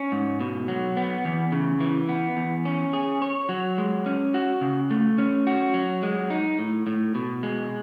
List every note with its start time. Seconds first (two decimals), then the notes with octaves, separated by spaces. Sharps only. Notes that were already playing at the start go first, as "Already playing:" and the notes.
Already playing: C#4
0.12 G#2
0.41 B2
0.68 F#3
0.97 B3
1.25 E2
1.52 C#3
1.80 E3
2.09 B3
2.37 E2
2.65 C#4
2.93 G#4
3.22 C#5
3.49 F#3
3.78 G#3
4.06 C#4
4.34 F#4
4.61 C#3
4.91 A3
5.18 C#4
5.47 F#4
5.74 F#3
6.03 G#3
6.30 D#4
6.59 A2
6.87 A2
7.15 B2
7.43 G#3